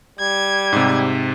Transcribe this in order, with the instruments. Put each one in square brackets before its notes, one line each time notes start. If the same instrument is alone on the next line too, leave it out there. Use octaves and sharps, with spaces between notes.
[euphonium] G3 [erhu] G#6
[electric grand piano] G#2 C3